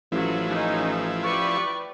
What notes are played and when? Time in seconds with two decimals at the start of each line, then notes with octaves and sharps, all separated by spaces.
0.12 A1 F3 F#3 E4
0.48 C#4 D#4
1.23 G4 B4 D5 C#6